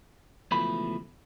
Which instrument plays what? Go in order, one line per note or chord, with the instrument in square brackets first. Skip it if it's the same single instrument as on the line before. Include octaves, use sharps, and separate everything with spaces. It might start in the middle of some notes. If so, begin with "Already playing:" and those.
[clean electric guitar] C#2 B2 E3 F3 A3 B5